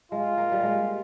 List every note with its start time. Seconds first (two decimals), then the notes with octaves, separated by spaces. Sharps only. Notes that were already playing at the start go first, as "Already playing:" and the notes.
0.12 G#3 F4
0.38 A#3
0.52 G3
0.63 G#3